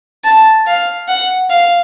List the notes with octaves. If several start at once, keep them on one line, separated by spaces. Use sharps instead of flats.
A5
F5
F#5
F5